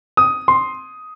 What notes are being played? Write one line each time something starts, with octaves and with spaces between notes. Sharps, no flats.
D#6
C6